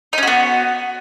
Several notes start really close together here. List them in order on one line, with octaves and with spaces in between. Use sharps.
D#4 C#4 F#4 B3